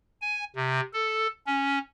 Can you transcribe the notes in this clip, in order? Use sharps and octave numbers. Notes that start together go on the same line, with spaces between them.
G#5
C3
A4
C#4